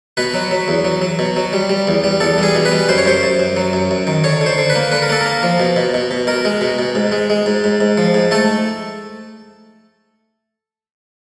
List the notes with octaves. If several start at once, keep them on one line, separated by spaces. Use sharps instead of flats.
B2 B4
F#3
F#3
E2
F#3
F#3
B2
F#3
G3
G3
E2
G3
E2 A4
G3 G#4
B2
B4
G3
F#2 C5
C#5
F#2 C5
F#2
F#2
F#3
F#2
F#2
D#3
D3 C#5
D3
C5
D3
B4
A#3
D3 B4
A#4
A#3 A4
A#4
A#3
F3
B2
B2
B2
B2
B2 A#4
G#3
B2
B2
G#2
G#3
G#3
G#2
G#2
G#2
F3
G#2
A3 A4